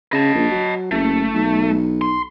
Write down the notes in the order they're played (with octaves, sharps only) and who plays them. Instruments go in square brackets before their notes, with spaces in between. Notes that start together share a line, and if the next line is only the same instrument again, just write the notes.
[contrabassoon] C#3 [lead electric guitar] D#5 A5
[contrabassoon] A#1
F#3
[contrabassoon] F#1 [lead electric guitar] A3
[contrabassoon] B1
[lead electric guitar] C6